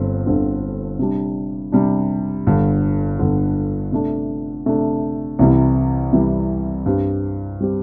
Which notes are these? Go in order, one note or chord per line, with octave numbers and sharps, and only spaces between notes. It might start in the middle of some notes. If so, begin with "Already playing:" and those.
Already playing: G1 G2 D3 C4
G1 G2 D3 C4
C3 G3 D4
C3 G3 D4
G1 G2 D3
G1 G2 D3
C3 A3 D4
C3 A3 D4
C2 C3 E3 G3
C2 C3 E3 G3
G2 G3 C4 G4
G3 C4 G4